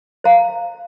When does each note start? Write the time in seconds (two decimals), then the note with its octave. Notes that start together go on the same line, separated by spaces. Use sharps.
0.24 C5 F5 A#5